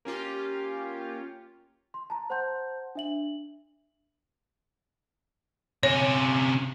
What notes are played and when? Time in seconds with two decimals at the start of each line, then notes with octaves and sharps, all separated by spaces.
0.05 A#3 C#4 F4 G4
1.94 C6
2.10 A5 A#5
2.30 C5 F#5 A5 C6 G6
2.95 D4 E5 F#7
5.83 C3 C#4 C#5